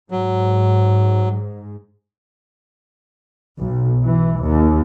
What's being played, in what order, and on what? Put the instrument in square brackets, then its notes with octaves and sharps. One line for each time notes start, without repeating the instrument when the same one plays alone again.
[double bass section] G#2 [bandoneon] F#3
[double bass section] B1
E3
D#2